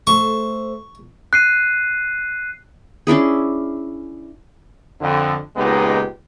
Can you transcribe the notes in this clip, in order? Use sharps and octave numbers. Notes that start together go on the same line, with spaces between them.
A3 C5 C#6
F#6 C7 D#7
C#4 D4 E4 G#4
F2 D3
C#2 A#2 G#3 B3 D#4 G4